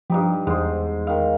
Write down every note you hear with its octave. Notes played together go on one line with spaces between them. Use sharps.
G2 F3 D#4 G4
E2 G#2 C5
D#3 F5